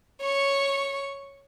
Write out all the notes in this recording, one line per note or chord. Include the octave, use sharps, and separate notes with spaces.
C#5 C#6